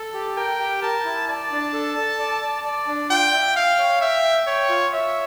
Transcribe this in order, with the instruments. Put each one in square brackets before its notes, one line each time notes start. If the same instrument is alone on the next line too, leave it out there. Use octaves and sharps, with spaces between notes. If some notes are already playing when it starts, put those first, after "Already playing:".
Already playing: [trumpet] A4
[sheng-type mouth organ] G4
[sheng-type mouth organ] A#4 [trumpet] G5
[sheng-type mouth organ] G4
[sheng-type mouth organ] A#4 [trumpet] A5
[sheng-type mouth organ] E4
[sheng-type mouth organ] D5 [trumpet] A5
[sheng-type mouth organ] D4
A4
A4
D5
D5
D5
D4
[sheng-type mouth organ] F4 [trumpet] G5
[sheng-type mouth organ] E5
[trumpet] F5 [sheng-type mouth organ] G5
[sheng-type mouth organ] C#5
[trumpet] E5 [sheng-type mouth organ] G5
[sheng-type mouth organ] G5
[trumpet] C#5 [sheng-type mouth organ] G5
[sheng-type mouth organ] F4
[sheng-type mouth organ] C#5 [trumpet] E5